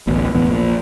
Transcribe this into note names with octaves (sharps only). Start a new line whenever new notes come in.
D1 A1 B2
E1 A2 E3 B3
A#1 A#2